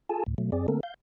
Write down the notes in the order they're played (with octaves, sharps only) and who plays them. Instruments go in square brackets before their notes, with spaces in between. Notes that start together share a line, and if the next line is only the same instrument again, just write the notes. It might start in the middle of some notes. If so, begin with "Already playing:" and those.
[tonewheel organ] F4 G#4 A4 G#5 A5
D2 A2
B2 F#3 A3
F#2 C4 G#4 D5
D3 A3 A#3 C4 A4 A#4
F5 G6